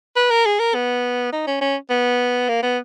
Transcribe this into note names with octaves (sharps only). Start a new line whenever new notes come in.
B4
A#4
G#4
A#4
B3
D#4
C#4
C#4
B3
A#3
B3